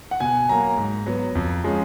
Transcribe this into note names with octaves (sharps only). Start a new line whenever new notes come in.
F#5
B2 G#5
F#3 A#3 A#5
G#2
F#3 B3
F2
F3 G#3 C#4